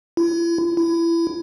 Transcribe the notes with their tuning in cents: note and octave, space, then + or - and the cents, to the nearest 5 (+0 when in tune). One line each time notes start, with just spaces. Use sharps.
E4 +40
E4 +25